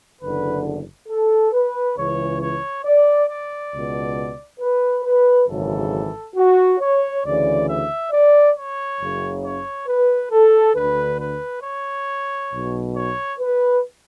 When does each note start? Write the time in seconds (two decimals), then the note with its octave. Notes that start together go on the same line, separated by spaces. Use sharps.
0.20 F#1 E2 D3 B4
1.08 A4
1.52 B4
1.96 C#2 C#3 E3 C#5
2.40 C#5
2.85 D5
3.28 D5
3.73 C#2 B2
4.60 B4
5.04 B4
5.48 G#1 F#2 C#3 E3 A4
6.36 F#4
6.80 C#5
7.24 D2 C#3 E3 D5
7.68 E5
8.12 D5
8.55 C#5
9.00 F#1 F#2 C#3
9.44 C#5
9.88 B4
10.32 A4
10.75 D2 D3 B4
11.20 B4
11.63 C#5
12.52 B1 B2
12.95 C#5
13.39 B4